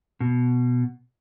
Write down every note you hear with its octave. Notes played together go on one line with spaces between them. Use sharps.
B2